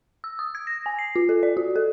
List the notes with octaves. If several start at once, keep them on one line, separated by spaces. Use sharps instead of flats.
E6
D#6
G#6
A#6
G#5
C7
F4
A4
D5
F#4
A4